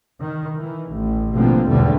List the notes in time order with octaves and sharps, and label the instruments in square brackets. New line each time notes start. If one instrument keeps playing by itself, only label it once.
[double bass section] D#3
E3
A1
B2 D3 F3 A#3 C4
B1 E2 G#2 D3 G3 A3